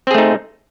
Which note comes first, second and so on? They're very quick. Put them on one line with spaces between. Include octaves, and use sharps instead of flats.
C4 G#4 A3 D#4